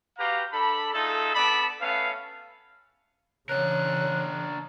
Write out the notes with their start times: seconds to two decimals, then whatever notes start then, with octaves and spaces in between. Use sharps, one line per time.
0.19 F#4 G4 B4 F5 G5 A#5
0.52 D4 A4 A5 B5
0.93 A3 D#4 F4 G#4 A4
1.35 B3 D4 A4 D5 A5 B5
1.81 A3 B3 C#4 B4 F5
3.49 C#3 E3 D4 A#4 C#5 F#6